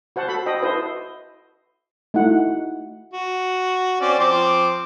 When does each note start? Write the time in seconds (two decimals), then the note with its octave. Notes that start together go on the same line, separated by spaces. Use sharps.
0.16 F#4 C5 F#5 A5
0.28 F#4 A4 B5
0.46 F#4 C5 D#5 G5
0.62 E4 F#4 A4 B4 C5 D#5
2.14 A3 D#4 E4 F#4 F#5
3.13 F#4
4.01 C4 C#4 D5
4.19 F3 C4 D6